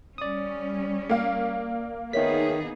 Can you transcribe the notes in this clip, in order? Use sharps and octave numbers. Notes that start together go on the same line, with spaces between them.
G3 C#4 D5 D#6
A#3 F5
D#3 B3 D#4 G#4 A#4 C#5 E5 B6